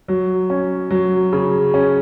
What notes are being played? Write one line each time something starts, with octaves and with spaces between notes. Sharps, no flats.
F#3
C#4
F#3
C#3
C#4